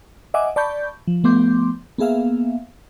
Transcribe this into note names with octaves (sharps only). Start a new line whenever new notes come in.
D#5 E5 F#5 G#5 D6
D5 A5 B5 C#6 G6
F3
F3 A3 B3 C6 D6 G6
A#3 B3 G#4 E5 F5